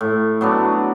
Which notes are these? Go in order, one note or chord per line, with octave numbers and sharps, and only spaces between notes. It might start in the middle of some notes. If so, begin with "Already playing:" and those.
A2
F#3 B3 D4